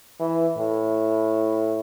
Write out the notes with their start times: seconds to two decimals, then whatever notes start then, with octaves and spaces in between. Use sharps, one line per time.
0.20 E3
0.58 A2